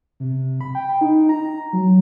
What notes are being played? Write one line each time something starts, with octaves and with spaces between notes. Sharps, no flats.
C3
B5
G5
D#4
A#5
F#3